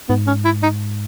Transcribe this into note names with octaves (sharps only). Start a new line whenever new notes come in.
G#2 B3
C#4
E4
D#4